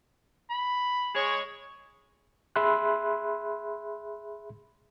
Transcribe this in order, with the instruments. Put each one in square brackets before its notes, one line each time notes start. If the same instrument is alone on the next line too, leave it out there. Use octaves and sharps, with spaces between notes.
[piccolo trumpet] B5
[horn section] G#3 C#5
[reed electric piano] G#4 E5 B5 C6 F#6